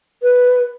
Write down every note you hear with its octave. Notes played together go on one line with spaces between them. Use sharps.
B4